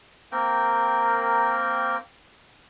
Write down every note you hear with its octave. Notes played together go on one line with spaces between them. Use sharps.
A#3 C4 A#4 G5